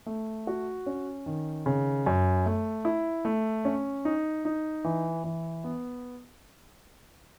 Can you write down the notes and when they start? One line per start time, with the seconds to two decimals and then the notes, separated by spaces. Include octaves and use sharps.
0.06 A3
0.47 F#4
0.86 C#4
1.26 D#3
1.66 C#3
2.06 F#2
2.46 A3
2.85 E4
3.25 A3
3.65 C#4
4.05 D#4
4.45 D#4
4.85 E3
5.24 E3
5.64 B3